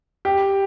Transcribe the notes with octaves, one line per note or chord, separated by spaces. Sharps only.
G4